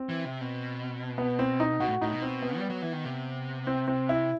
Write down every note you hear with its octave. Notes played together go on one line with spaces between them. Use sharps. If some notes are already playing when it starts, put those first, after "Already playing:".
Already playing: C4
E3
C3
B2
B3
C4
D#4
B2 F#4
A2
A2 D#4
B2
C4
B3
G3
F#3
E3
D#3
C3
C4
C4
E4